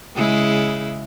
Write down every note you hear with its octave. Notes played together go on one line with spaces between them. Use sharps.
C#3 G#3 E4